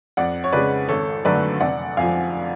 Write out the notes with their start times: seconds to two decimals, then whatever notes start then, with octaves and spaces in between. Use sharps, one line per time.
0.17 F2 D5 F#5
0.44 C#5
0.53 C#3 G#3 B4 D5
0.88 G#1 A4 C#5
1.25 F#2 D3 F#3 A3 B4 D5
1.60 F1 D5 F#5
1.97 F2 F3 F5 G#5